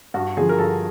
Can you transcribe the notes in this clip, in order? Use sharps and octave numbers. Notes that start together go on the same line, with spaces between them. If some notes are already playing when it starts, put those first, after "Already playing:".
G2 F#4
D3 F3 G#4
A#4
G2 A4